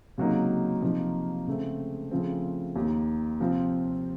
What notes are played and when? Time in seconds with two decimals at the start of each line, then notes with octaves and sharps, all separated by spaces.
0.18 C#2 C3 F#3 A#3 D#4
0.82 C3 F3 A#3 D#4
1.47 C#2 C#3 A3 C4
2.11 C#3 F3 A3 C4 F4
2.76 D#2 D#3 A#3
3.40 C3 F3 C4 F4